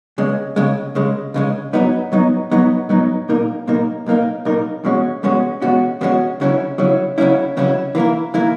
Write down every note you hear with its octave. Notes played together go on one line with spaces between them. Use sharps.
C#2 C#3 G#3
C#2 C#3 G#3
C#2 C#3 G#3
C#2 C#3 G#3
G#2 F#3 B3 D#4
G#2 F#3 B3 D#4
G#2 F#3 B3 D#4
G#2 F#3 B3 D#4
B1 A#2 A#3 D#4 A#4
B1 A#2 A#3 D#4 A#4
B1 A#2 A#3 D#4 A#4
B1 A#2 A#3 D#4 A#4
E2 B2 G#3 C#4 F#4
E2 B2 G#3 C#4 F#4
E2 B2 G#3 C#4 F#4
E2 B2 G#3 C#4 F#4
C#2 C#3 F#3 C#4 E4
C#2 C#3 F#3 C#4 E4
C#2 C#3 F#3 C#4 E4
C#2 C#3 F#3 C#4 E4
E3 A#3 E4 A#4
E3 A#3 E4 A#4